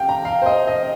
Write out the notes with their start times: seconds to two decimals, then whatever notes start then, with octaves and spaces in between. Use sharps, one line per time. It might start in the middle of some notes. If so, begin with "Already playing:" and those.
Already playing: F5 G5
0.09 A#5
0.25 F5
0.42 C5
0.46 D#5
0.67 D#5